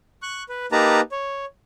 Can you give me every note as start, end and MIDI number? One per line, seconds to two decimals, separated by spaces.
0.22 0.43 85
0.22 0.43 90
0.49 0.66 71
0.72 1.01 58
0.72 1.01 63
0.72 1.01 67
0.72 1.01 71
0.72 1.01 81
0.72 1.01 82
1.12 1.45 73